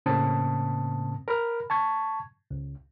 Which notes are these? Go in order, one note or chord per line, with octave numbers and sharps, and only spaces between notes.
A2 C#3 A#3 C4 A5 D#6
A#4 B5 F6
A5 C#6 G#6
C#2